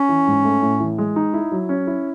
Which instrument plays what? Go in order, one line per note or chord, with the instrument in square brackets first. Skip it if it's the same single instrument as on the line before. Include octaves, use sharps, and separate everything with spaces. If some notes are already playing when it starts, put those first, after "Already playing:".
Already playing: [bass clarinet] C#4
[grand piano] E3
G#2
A3
A2
E3
G#3
D#4
E4
F#3
C#4
E4